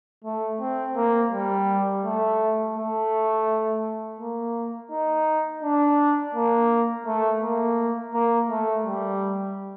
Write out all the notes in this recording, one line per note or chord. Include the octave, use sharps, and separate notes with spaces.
A3
C4
A#3
G3
A3
A3
A#3
D#4
D4
A#3
A3
A#3
A#3
A3
G3